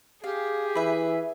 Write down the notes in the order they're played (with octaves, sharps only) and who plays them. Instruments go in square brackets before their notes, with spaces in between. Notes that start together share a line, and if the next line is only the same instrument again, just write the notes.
[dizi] G4 [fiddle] G#4 [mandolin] F5
[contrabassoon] E3 [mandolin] B4 E5